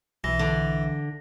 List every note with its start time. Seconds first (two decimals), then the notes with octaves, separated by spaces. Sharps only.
0.24 B1 E3 A#6
0.39 D3